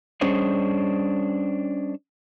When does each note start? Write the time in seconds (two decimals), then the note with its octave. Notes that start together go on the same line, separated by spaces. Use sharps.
0.21 G3 C#4 D4 G#4 C5 D#5